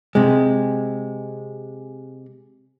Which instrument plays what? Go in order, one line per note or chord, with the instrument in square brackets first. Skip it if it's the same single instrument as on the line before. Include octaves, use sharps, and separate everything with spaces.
[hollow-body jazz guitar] C3 G#3